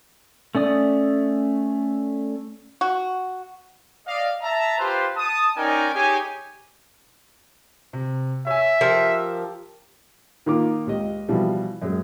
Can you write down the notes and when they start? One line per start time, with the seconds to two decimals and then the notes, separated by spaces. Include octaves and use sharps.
0.55 A3 C#4 D5 D#6
2.81 F#4
4.06 D5 D#5 F5
4.42 E5 A5 A#5
4.79 F4 G4 B4 C5
5.16 A5 D#6
5.56 C#4 D#4 A#4 D5 G5 G#5
5.94 D#4 G4 G#4 C#5 G#5
7.93 C3
8.47 C#5 E5 G#5
8.81 F3 G4 A#4
10.46 D#3 A#3 F4 A#4 D6
10.87 C#2 G4 D#5
11.29 B2 E3 F3 G3
11.82 F#2 G#3